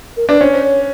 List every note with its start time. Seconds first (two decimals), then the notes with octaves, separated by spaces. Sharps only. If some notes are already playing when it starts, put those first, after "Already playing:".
0.17 A#4
0.28 D4 B4
0.40 C#4 C5
0.54 C5
0.64 C#5